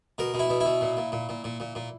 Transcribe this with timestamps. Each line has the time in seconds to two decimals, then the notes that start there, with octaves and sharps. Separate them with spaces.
0.18 B2 A#4
0.34 B2
0.39 E4
0.50 B2
0.61 B2 E4
0.81 A#2
0.97 A#2
1.12 A#2
1.29 A#2
1.44 A#2
1.60 A#2
1.75 A#2